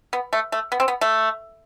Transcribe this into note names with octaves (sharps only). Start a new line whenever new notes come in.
B3
A3
A3
B3
C4
B3
A3